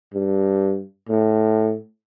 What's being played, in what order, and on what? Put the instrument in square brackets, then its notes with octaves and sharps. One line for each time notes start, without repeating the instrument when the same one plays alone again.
[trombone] G2
A2